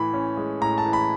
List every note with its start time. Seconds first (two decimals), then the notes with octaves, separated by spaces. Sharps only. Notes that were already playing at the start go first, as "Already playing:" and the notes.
Already playing: A2 E3 B5
0.14 C#4
0.37 G#3
0.62 A2 A#5
0.78 A5
0.85 E3
0.93 B5